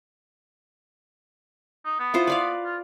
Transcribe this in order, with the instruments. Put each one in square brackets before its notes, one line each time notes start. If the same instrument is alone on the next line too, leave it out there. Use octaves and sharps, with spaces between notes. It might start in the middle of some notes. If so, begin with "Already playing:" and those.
[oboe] D#4
B3
[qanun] E4 F4 C5
B4 D5 F5
[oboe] F4